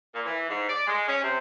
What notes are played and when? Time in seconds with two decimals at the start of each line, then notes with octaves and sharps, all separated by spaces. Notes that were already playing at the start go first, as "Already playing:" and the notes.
0.14 A#2
0.26 E3
0.49 G#2
0.69 D5
0.87 G#3
1.08 C#4
1.23 C3